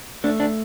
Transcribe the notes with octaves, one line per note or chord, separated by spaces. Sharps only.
A3 D4
D4